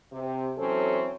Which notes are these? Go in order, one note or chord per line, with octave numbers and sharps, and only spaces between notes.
C3
E3 F#3 C4 C#4 A4